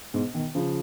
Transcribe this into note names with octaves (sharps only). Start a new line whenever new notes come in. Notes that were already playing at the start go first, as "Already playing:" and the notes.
G#2 B2
B2 D#3
C#3 F3